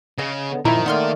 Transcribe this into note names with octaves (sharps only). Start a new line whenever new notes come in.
C#3 G#4 D#5
D3 B3
F#2 A#2 D#3 F3 E4 E5 A#5
A3 A#3 D#4 D5 F#5 C6 F6